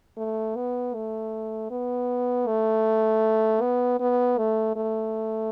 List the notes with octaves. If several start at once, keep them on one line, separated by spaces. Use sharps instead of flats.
A3
B3
A3
B3
A3
B3
B3
A3
A3